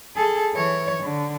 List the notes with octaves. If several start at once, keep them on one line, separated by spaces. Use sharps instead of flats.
G#4 A4
E3 C#5
D3